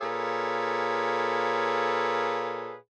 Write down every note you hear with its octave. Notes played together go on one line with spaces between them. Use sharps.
A#2 G#4 A4 B4 C#5 F5